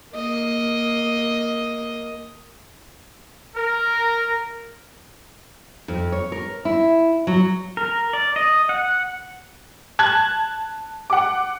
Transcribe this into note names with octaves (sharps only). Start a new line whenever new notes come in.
A#3 D#5
A#4
F2
C#5
A#4
E4
F#3
A#4
D5
D#5
F#5
A5 F#6 G#6
F#5 D6